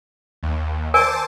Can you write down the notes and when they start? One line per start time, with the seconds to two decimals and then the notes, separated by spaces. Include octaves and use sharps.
0.43 D#2
0.94 A#4 C5 D5 G#5 A5 D6